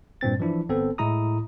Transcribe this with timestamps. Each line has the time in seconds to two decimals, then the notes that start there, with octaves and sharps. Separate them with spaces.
0.21 G2 A#2 C4 A6
0.40 E3 F3 D4 E4
0.69 G1 B3 C4 A4
0.98 A2 G#3 E4 A#5 D#6